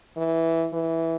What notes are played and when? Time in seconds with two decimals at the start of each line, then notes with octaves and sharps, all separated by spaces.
0.17 E3
0.73 E3